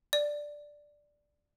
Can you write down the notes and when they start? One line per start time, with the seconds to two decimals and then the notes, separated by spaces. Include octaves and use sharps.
0.13 D5